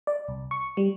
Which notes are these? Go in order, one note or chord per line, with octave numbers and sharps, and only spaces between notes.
D5
C2
C#6
G3